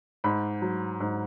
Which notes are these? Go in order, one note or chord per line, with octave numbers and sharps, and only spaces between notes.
G#2 B5
F#3
G#2